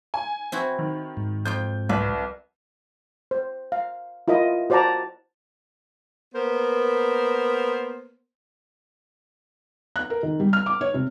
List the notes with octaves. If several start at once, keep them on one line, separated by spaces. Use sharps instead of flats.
G#5
C4 E4 F#4
D#3
G#2
F2 F4 G5 G6
C2 B4
C5
F5
E4 F4 A#4 D#5
F#4 C5 D5 F#5 A5 A#5
A#3 B3 A#4 C5
F#6
A#4
D#3
G3
F6
D6
C#5
C3